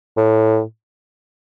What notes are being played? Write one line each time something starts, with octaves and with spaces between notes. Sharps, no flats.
A2